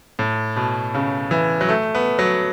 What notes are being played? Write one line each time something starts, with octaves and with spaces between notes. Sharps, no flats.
A2
B2
C#3
E3
F#3
A3
B3
F#3